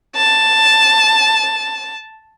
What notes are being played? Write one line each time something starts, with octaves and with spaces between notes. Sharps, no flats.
A5